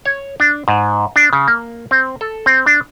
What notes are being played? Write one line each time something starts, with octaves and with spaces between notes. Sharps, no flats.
C#5
D4
G#2
D4
C#3
A#3
C4
A4
C4
D4